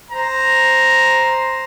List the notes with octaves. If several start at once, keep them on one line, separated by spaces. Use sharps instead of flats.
C5 A#5